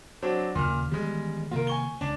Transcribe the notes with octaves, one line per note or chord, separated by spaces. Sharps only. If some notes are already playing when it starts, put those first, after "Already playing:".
F#3 C4 D4
D#2 A#2 C#3 F6
D#3 E3 G3 G#3 B3
C3 D#3 A#3 F4 A#4
G#5 C#6 G7
C#2 C#4 D4